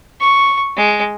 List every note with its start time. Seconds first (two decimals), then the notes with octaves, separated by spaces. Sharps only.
0.21 C#6
0.77 G#3